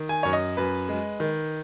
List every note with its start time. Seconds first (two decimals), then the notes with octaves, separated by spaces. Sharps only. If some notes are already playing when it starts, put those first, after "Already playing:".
Already playing: D#3
0.09 G#5
0.23 F#2 C#5
0.33 D#5
0.57 F#2 B4
0.89 G#3
1.20 D#3